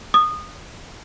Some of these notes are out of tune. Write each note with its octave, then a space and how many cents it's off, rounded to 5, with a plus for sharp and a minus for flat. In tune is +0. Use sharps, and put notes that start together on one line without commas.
D#6 -20